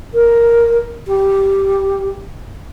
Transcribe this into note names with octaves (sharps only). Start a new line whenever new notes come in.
A#4
G4